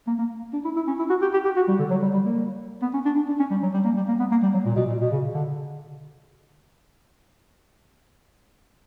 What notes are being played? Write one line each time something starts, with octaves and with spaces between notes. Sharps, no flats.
A#3
A#3
D4
E4
E4
C#4
E4
F#4
G4
G4
G4
F#4
G3
D3
F#3
G3
G3
A#3
B3
C#4
D4
D4
D4
C#4
G3
F#3
G3
A#3
G3
A#3
B3
A#3
G3
F#3
A#2
B2
A#2
B2
C#3
D3